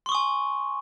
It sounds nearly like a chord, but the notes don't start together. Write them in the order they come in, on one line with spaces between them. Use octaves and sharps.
C6 C#6 D#6 G#5